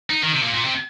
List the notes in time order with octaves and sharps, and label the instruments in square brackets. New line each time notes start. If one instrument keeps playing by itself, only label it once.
[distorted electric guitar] D#4
D#3
C3
A#2
A#2
C3